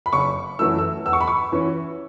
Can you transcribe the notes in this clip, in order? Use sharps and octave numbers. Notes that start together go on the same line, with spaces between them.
B5
F#1 C#6
F#2 E3 A3 E4 E6
E6
E2 E6
C#6
B5
C#6
E3 C#4 E4